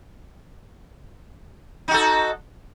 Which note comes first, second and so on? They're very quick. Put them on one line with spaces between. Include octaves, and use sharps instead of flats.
D#4 F#4 A4